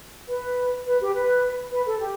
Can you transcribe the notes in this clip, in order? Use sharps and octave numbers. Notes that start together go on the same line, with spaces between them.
B4
B4
G4
B4
B4
A4
G4